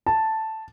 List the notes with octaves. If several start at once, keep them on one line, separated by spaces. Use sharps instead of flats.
A5